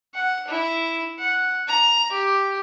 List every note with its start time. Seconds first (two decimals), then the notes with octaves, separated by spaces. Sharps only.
0.14 F#5
0.47 E4
1.19 F#5
1.68 A#5
2.11 G4